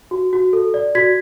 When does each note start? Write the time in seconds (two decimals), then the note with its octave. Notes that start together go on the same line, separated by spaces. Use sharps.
0.11 F#4
0.33 F#4
0.53 A4
0.74 D5
0.95 F#4 G#6 B6